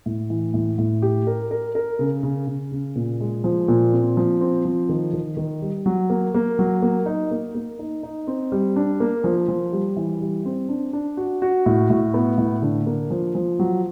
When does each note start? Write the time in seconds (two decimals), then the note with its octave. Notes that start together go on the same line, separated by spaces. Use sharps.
0.06 A2
0.30 E3
0.54 A2
0.78 A2
1.02 G4
1.27 A#4
1.51 A#4
1.75 A#4
1.99 C#3
2.23 C#3
2.47 C#3
2.72 C#3
2.96 A#2
3.20 G#3
3.44 F3
3.68 A#2
3.93 C4
4.17 F3
4.41 C4
4.65 F3
4.89 D#3
5.13 D#3
5.37 D#3
5.62 G3
5.86 F#3
6.10 A#3
6.35 A#3
6.59 F#3
6.82 A#3
7.06 D#4
7.31 A#3
7.55 A#3
7.79 D#4
8.03 D#4
8.27 C4
8.52 G3
8.76 D4
9.00 A#3
9.24 F3
9.48 F3
9.72 G3
9.97 E3
10.21 G3
10.45 C4
10.69 D4
10.93 D4
11.17 F#4
11.42 F#4
11.66 A2
11.90 A2
12.14 B3
12.38 A2
12.62 D3
12.87 A#3
13.11 F3
13.35 F3
13.59 F#3